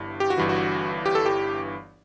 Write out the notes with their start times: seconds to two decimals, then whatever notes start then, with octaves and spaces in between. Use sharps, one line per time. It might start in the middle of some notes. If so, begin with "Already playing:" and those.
Already playing: G1 G2 E3
0.20 G4
0.30 F#4
0.38 G1 G2 E3
0.49 F#4
1.06 G4
1.15 A4
1.26 G4